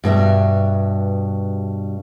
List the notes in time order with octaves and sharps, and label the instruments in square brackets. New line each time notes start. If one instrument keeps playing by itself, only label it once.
[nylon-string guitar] G2 B2 G3 E5